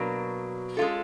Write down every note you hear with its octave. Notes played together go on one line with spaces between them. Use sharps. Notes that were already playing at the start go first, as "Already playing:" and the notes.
Already playing: B2 F#3 A#3 D4
G#3 C#4 F4 A4